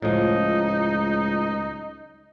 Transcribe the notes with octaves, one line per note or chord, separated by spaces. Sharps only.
C#2 A2 F3 D#4